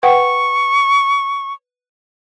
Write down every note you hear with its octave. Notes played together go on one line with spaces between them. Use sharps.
B4 F#5 G5 C#6